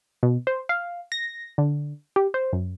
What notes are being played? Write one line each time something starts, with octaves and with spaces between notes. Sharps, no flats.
B2
C5
F5
A#6
D3
G4
C5
F#2